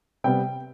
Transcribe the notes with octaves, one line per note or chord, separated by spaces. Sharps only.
C3 G3 B3 G5